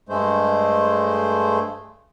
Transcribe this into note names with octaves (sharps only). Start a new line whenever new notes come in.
G2 G#3 A3 C5